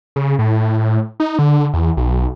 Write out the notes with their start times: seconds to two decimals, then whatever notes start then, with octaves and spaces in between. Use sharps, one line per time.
0.16 C#3
0.39 A2
1.20 D#4
1.39 D3
1.74 E2
1.97 B1